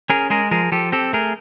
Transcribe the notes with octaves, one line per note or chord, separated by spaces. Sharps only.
C#4 G#4 A#4
G#3 G#4 A#4
F3 G#4 A#4
F3 G4 A4
C4 G4 A4
A3 G#4 A#4